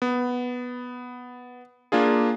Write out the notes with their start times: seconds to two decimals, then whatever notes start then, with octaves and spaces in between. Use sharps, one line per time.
0.02 B3
1.92 A#3 D4 F4 G#4